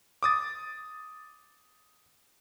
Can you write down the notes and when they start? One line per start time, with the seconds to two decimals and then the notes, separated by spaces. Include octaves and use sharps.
0.23 D6 D#6 A6